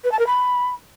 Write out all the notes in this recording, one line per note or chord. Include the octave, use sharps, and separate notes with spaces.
B4
A5
A#4
B5